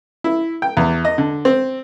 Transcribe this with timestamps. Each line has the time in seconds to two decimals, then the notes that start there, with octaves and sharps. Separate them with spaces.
0.24 E4
0.62 G5
0.77 E2
1.05 D#5
1.18 D3
1.45 C4